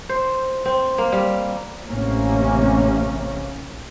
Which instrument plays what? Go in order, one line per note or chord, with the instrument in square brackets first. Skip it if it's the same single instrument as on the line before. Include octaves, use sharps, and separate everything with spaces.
[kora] C5
C4
A#3
G3
[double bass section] A1 A2 C3 A#3 C#4